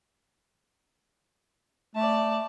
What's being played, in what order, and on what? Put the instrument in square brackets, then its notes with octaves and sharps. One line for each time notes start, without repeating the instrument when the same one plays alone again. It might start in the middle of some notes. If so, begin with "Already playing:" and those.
[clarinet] A3 [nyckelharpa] D5 A5